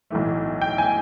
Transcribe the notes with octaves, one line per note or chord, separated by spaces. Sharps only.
B1 A2 E3 A3
G5
G#5